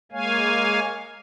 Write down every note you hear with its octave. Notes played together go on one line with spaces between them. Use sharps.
G#3 A#3 C#5 F5 G#5